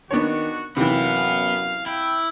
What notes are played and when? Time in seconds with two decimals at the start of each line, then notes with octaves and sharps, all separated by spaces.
0.11 D#3 B3 D4 F#4 C#5
0.77 F#2 C3 E3 B3 F5
1.86 E4 G5